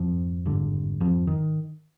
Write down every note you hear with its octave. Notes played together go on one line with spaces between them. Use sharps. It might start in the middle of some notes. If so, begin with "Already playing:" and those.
Already playing: G#1 F2 F3
G#1 G2 D3
F2 F3
D#3